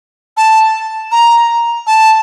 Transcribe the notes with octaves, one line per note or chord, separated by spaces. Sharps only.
A5
A#5
A5